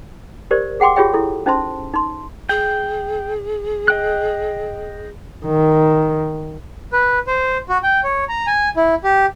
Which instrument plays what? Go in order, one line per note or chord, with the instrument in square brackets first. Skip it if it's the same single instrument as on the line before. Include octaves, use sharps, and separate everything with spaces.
[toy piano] G4 A#4 C5 D5
G#4 F#5 G5 C6 D6
F4 G4 G#4 C#5 E5 G5
E4 A4
C#4 D#4 C5 E5 A5 C6
D#4 C6
[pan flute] G#4 [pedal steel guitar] G5
[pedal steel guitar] D#5 G5 F#6
[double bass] D#3
[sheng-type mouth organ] B4
C5
F#4
G5
C#5
A#5
G#5
E4
G4